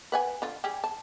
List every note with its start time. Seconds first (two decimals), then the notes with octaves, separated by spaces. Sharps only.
0.12 B4 F#5 G#5
0.42 D3 F4
0.64 G3 G4 G#4
0.84 A5